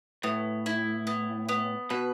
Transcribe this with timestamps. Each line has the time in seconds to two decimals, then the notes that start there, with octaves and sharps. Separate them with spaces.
0.23 A2 B3
0.66 E4
1.07 B3
1.49 B3
1.90 B2 B4